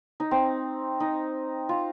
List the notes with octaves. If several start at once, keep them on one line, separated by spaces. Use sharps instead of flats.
D#4
C4
D#4
F4